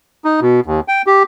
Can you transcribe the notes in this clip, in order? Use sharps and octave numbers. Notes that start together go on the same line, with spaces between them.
D#4
B2
D#2
G5
G4